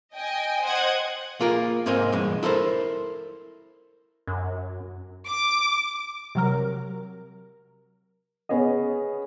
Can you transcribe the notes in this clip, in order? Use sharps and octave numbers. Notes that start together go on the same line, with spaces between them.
D#5 G5 G#5
C5 D#5 F#5 G#6
A#3 F4 G#4 A#4
G#2 A#3 C4 A#4 C5 G#5
G2 B2 E3 G#3
E4 A4 A#4 C5
F#2
D6
C3 F#3 A#4
B3 C#4 G#4 D#5